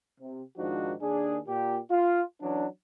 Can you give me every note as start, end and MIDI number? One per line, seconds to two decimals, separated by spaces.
0.20 0.43 48
0.58 0.94 44
0.58 0.94 51
0.58 0.94 53
0.58 0.94 62
0.58 0.94 63
0.58 0.94 66
1.01 1.38 39
1.01 1.38 62
1.01 1.38 68
1.48 1.78 46
1.48 1.78 67
1.91 2.22 65
2.41 2.66 52
2.41 2.66 54
2.41 2.66 61
2.41 2.66 62